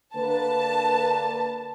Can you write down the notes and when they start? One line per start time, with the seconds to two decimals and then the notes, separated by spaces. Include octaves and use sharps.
0.16 D3 A#3 B4 A5